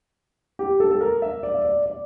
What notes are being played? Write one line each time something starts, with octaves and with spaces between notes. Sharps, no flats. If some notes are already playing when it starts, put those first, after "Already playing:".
G4
A4
A4
A#4
E5
D5
E5
D5
D5